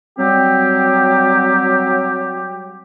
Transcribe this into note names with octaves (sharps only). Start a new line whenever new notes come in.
F#3 G3 C4 G4